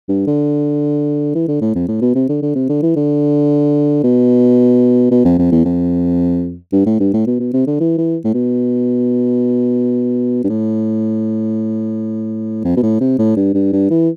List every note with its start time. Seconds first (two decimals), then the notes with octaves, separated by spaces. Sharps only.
0.09 G2
0.27 D3
1.35 E3
1.48 D3
1.61 A2
1.75 F2
1.88 A2
2.01 B2
2.15 C3
2.29 D3
2.42 D3
2.55 C3
2.69 D3
2.83 E3
2.96 D3
4.04 B2
5.11 B2
5.25 F2
5.38 F2
5.52 E2
5.65 F2
6.73 G2
6.86 A2
7.00 G2
7.13 A2
7.27 B2
7.40 B2
7.53 C3
7.67 D3
7.80 E3
7.98 E3
8.25 A2
8.34 B2
10.44 G2
10.49 A2
12.64 F2
12.77 B2
12.83 A2
13.00 C3
13.19 A2
13.36 G2
13.54 G2
13.72 G2
13.91 E3